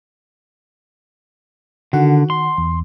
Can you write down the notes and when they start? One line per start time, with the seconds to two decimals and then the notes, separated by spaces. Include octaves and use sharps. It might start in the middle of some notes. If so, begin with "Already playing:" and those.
1.93 D3 D#3 F#4 F#5
2.30 C6
2.58 E2